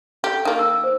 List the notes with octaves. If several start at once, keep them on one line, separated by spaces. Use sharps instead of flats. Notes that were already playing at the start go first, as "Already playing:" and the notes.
G4 A4
D#3 A#3
E6
C5